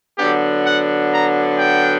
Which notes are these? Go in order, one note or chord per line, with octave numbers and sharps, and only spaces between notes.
D3 F#3 B3 D4 G4
F#5
A#5
G5